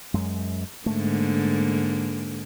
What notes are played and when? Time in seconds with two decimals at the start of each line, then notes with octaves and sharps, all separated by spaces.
0.14 F#2 G#3
0.86 G#2 D3 A3 A#3